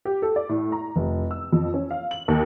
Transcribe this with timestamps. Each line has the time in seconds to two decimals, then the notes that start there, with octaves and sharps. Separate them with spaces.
0.05 G4
0.22 A4
0.36 D5
0.49 A2
0.72 A#5
0.96 F1
1.31 E6
1.53 F2
1.74 C#4
1.91 F5
2.11 F#7
2.28 D#2